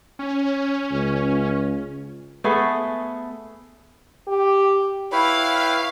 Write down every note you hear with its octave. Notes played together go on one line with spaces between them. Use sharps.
C#4
C#2
A3 B3 G#4 A4
G4
E4 B4 C#5 F5 G5 B5